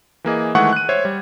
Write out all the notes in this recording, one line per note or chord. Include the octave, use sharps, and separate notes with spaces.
E3 A#3 G#4 D#5
D#3 E3 G#3 A3 F#5 C#6
F#6 D#7
C5 C#5 E5 G#6
G3